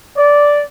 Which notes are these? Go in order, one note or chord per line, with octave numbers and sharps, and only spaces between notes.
D5